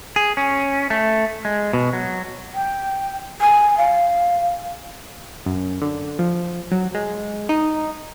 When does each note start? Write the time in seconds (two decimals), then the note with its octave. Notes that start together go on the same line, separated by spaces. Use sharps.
0.16 G#4
0.37 C#4
0.90 A3
1.45 G#3
1.73 B2
1.93 F#3
2.55 G5
3.41 G#5
3.77 F5
5.46 F#2
5.82 D3
6.19 F3
6.72 F#3
6.95 G#3
7.49 D#4